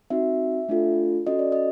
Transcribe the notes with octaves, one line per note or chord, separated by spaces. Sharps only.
C4 D#4 F#4 E5
A3 D4 F4 A4
C#4 F#4 A4 D#5
D5
D#5